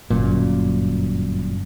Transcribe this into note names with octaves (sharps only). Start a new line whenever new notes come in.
G1 F#2 A#2